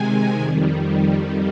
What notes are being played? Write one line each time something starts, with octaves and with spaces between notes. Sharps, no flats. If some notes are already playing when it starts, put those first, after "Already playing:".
Already playing: C3 D#3 G#3 G#5
F2 D#3 G3